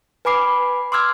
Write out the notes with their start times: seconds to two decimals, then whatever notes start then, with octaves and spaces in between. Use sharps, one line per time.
0.25 B4 G#5 B5 D6 C7
0.92 C6 D6 E6 F6 G#6